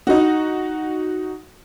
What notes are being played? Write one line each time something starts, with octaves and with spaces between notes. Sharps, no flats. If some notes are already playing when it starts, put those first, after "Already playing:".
D#4 F#4